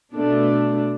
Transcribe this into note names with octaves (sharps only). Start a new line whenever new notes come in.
B2 A3 D4